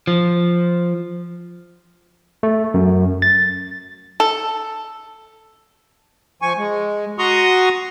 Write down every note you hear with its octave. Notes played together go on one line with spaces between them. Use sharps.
F3
A3
F#2
A6
A4
F3 G#5 C#6
G#3
F#4 A#5 C6 C#6 D#6